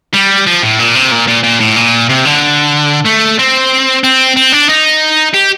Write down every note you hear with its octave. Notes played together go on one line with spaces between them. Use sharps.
G3
F3
A2
A#2
C3
A#2
A#2
A#2
A2
A#2
C3
D3
A3
C4
C4
C4
D4
D#4
G4